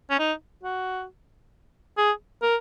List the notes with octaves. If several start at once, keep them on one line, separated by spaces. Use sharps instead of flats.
C#4
D#4
F#4
G#4
A#4